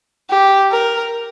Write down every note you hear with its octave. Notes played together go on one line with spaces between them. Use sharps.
G4
A#4